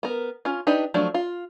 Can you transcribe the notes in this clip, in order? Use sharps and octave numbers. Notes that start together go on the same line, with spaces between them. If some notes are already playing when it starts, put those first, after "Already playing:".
B3 A#4
C#4 F4
D4 D#4 G4 B4
F3 F#3 A3 D4
F4